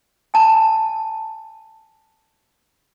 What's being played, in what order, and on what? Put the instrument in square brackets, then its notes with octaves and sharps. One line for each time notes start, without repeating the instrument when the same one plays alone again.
[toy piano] G#5 A5